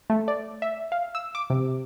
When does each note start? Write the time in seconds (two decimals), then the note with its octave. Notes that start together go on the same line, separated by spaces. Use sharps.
0.10 A3
0.28 D5
0.62 E5
0.92 F5
1.15 E6
1.35 D6
1.50 C3